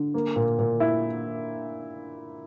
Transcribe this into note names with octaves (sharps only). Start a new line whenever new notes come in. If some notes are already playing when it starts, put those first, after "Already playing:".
Already playing: D3
A#3
A#2
A#2
E4